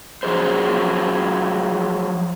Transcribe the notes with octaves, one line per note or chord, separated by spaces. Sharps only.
F3 F#3 G#4 C5